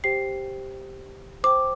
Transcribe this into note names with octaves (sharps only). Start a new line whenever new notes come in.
G4 C5 G5 C7
C5 G5 D6